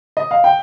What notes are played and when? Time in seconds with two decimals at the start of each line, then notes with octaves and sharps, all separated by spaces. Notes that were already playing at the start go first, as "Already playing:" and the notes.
0.17 D#5
0.31 F5
0.44 G5